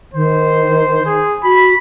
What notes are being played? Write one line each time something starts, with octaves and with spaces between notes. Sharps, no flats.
D#3 C5
G#4
F#4 B5